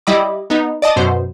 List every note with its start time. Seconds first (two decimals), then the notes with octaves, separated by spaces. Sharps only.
0.07 G3 E4 D#5 B5 D6
0.50 B3 D#4
0.82 D5 D#5 A5 D#6
0.96 F#2 B2 C5